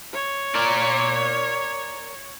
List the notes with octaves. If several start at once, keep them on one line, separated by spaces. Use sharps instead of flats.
C#5
A#4 D5